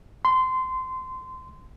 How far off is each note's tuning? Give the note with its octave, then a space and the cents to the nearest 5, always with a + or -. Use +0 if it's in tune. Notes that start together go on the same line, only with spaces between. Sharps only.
C6 -20